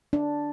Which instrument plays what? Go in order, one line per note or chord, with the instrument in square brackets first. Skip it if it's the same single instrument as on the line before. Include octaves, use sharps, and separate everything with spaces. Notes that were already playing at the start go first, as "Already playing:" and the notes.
[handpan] D4